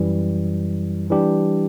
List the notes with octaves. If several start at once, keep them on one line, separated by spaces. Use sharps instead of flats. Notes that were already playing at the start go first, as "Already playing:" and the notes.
Already playing: F#2 E3 G3
E3 G3 D4 G4